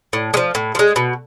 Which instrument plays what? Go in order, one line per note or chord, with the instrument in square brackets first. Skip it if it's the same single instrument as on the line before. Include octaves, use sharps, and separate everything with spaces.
[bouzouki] A2
G#3
F3
A2
F3
G#3
B2